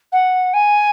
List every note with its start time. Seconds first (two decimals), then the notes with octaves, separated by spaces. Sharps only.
0.12 F#5
0.53 G#5